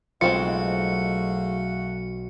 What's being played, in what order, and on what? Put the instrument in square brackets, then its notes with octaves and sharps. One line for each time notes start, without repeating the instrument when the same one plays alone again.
[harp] B1 [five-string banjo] G#3 C4 F4 [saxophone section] A3 F#4 F5 [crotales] C#7